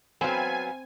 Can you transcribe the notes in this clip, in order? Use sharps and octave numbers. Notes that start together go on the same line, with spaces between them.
F#3 B3 C4 F5 G5 G#5 B5